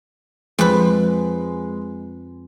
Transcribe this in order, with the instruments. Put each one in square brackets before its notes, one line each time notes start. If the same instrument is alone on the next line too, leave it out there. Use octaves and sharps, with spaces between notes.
[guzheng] F2 B4 [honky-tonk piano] G#3